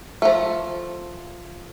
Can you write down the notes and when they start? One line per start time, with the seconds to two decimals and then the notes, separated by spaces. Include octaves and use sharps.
0.22 F3 A3